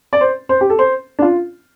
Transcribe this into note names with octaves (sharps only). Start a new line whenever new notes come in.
D5
C5
C5
G4
A4
C5
D4
F4